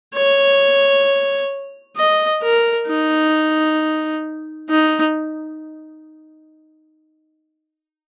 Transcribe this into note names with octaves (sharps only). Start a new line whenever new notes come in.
C#5
D#5
A#4
D#4
D#4